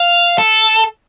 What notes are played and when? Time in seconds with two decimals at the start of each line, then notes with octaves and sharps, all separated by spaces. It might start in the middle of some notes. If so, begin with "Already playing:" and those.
Already playing: F5
0.38 A4